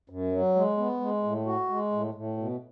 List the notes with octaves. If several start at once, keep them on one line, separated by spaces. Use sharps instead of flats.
F#2
F#3
G#3
B3
G#3
A2
F#4
G#3
A2
A2
B2